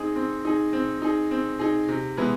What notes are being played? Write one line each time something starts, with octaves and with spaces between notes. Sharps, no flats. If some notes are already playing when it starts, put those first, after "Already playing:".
Already playing: C4 D#4 G#4
C4
D#4 G#4
C4
D#4 G#4
C4
D#4 G#4
C3
E3 G#3 B3 E4